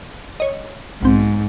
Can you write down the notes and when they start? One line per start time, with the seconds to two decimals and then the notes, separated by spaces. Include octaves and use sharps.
0.40 C#5 D#5
1.03 B1 G#2 C4